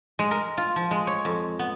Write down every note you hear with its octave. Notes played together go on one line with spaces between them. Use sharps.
G#3
A#4
F4
F3
G#3
C#5
F2
B3